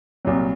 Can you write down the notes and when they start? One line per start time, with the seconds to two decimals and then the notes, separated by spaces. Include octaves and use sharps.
0.25 C2 A#2 F#3